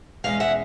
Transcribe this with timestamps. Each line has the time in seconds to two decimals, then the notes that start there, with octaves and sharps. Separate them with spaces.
0.24 E2 B2 G#3 C#4 F5
0.40 E5 F#5